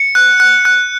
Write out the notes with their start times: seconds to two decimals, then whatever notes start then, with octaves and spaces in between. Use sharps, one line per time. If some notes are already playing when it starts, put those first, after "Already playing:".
Already playing: C#7
0.15 F#6
0.40 F#6
0.65 F#6